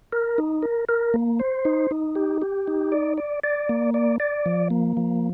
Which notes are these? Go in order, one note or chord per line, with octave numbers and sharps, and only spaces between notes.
A#4
D#4
A#4
A#4
A#3
C5
D#4
D#4
G4
G4
D#4
D5
D5
D5
A#3
D5
D5
F3
A#3
F3